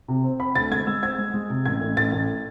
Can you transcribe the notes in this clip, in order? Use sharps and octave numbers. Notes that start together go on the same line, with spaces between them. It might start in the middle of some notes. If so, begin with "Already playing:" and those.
C3
C4
C4 B5
D2 A6
G#3 G#6
G#3 E6
C4 G#6
G#3
G#3
C3
A1 G#6
A1
A1 A6
A1